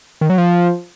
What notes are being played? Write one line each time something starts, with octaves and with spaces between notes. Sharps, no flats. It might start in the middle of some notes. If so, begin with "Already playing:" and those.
D#3
F#3
F3